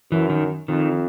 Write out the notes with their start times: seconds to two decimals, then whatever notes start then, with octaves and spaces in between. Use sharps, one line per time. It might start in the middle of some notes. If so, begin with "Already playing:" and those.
0.11 F#2 E3
0.30 D#3
0.68 F2 D#3